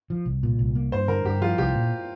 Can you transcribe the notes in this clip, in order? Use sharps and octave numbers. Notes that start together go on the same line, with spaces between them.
F3
C2
A#2
C2
A#3
G2 C5
D3 A#4
G2 G4
F3 F4
C2 G4
A#2